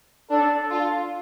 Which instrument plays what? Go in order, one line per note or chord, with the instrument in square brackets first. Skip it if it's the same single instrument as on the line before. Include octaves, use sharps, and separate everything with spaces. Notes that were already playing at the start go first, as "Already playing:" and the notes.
[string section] D4 [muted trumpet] A4
[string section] F4